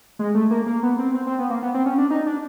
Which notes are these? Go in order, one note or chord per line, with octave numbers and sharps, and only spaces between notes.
G#3
A3
A#3
A#3
B3
C4
C4
C4
B3
A#3
B3
C4
C#4
D4
D#4
D4